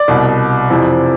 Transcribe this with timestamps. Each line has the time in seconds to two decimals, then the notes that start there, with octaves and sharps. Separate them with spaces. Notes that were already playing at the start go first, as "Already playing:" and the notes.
Already playing: D5
0.08 C2 B2
0.70 F2 C3 E3